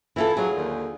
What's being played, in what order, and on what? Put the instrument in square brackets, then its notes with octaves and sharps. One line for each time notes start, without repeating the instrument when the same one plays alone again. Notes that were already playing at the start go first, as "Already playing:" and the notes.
[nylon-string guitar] E3 F4 A4 [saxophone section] E4
[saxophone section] F#3 [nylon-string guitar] F4 G#4
[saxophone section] D#2 D3